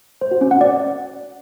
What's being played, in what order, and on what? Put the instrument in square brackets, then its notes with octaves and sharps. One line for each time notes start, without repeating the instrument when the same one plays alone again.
[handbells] C5
F#4
C#4
F#5
D5